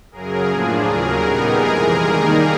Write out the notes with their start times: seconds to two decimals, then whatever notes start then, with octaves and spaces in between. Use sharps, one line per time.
0.12 F#2 C#3 F#3 G#4 A#4
0.48 A2 F3 A#3 D4 F4 G#4
0.84 D#2 C#3 F#3 G#4 A#4
1.20 A#2 G3 B3 D#4
1.57 F2 C3 E3 G#3 G#4 A#4
1.93 D#3 G3 A#3 D#4